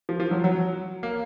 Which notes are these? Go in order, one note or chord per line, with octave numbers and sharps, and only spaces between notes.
F3
F3
F#3
F#3
A#3